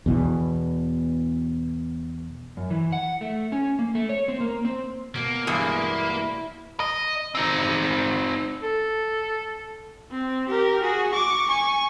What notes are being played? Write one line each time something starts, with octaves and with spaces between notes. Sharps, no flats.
E2 B2 E3
F#2
E3
F#5
A3
C#4
A#3
A3
C#5
C4
A#3
C4
B2 A#3
E2 G2 G#3 E4
D#5
C4 D#4
A4
C4
G4 A#4
F#4 G#4
C#6 D6
G#5 C#6